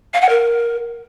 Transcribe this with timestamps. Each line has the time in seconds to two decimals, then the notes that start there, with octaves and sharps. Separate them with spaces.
0.13 F5
0.21 F#5
0.29 A#4